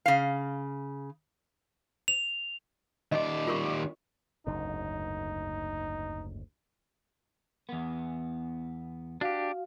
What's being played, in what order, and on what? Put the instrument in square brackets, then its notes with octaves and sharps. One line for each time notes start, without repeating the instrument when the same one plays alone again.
[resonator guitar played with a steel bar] C#3 F5
[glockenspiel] F7
[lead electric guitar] D#2 D5 [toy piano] D#5
[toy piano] F4 A#4 C#6
[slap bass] F#1 D2 G#2 [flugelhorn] D#4
[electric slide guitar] E2 B3
[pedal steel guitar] D4 G4 [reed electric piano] F#4 F5